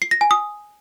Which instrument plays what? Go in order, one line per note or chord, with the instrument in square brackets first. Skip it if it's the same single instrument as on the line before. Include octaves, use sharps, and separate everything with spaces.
[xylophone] C7
A#6
G#5
D#6